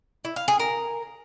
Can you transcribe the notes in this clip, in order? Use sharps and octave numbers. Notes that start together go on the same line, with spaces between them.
E4
F5
G#4
A#4